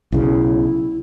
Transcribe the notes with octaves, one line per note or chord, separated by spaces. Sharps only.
B1 C#3 E4